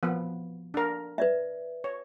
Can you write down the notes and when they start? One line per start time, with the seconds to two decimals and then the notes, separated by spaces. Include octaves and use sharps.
0.03 F3 B3
0.74 D4 A#4
1.18 B4 D5 E5
1.84 C#5